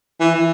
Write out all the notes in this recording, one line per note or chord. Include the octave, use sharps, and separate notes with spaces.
E3
E3